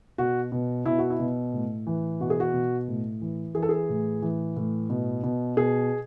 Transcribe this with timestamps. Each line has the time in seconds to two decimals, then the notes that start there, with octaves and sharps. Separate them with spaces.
0.18 B2 F#4
0.52 B2
0.86 B2 E4
0.98 F#4
1.10 E4
1.19 B2
1.53 A2
1.87 E3
2.20 B2 F#4
2.30 G#4
2.40 F#4
2.53 B2
2.88 A2
3.21 E3
3.55 E3 G#4
3.63 A4
3.69 G#4
3.89 A2
4.22 E3
4.56 A2
4.90 B2
5.23 B2
5.57 B2 G#4